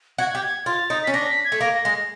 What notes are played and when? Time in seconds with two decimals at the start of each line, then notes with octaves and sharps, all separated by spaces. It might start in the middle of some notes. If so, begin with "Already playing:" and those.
0.18 F#4 G#6
0.35 G4
0.42 G#6
0.66 F4 A6
0.90 D#4
1.04 C#4 B6
1.13 D4 A#6
1.29 B6
1.45 G#6
1.52 A3
1.61 A#3 A#6
1.85 G#3